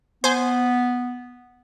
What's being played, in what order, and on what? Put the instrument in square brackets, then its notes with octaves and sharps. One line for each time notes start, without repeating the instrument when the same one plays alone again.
[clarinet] B3 [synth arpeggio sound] C5 G#5